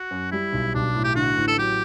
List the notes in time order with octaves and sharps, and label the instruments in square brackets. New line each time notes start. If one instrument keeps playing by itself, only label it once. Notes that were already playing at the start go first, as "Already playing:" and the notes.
Already playing: [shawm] F#4
[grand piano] F#2
[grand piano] G3 [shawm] E4
[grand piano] B1
[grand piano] B1 [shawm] D4
[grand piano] A2
[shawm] G4
[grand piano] D3 [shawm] F#4
[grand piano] A1
[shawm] A4
[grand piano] F#3 [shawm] G4